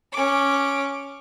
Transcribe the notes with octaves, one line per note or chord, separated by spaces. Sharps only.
C#4 D6